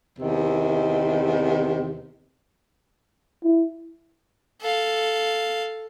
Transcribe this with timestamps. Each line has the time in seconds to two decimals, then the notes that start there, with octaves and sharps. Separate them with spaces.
0.19 E2 C3 D#3
3.44 E4
4.61 A4 F5